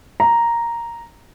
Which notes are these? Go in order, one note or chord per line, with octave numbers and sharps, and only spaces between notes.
A#5